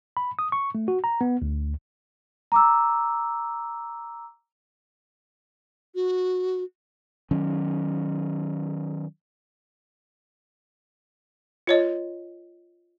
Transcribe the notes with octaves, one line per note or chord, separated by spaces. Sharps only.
B5
D#6
C#6
A3
F#4
A#5
B3
D2
A#5 D6 E6
F#4
D#3 F#3 C#4
F4 C#5 D#5